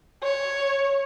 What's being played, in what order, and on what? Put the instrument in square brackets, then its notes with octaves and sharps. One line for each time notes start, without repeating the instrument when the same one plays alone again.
[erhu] C#5